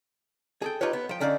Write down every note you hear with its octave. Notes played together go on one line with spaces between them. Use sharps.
G#4 A4 G5
D#4 F4 G4 B4 C#5
B3
F3 G5
D3 C#4 D#4 D5 F5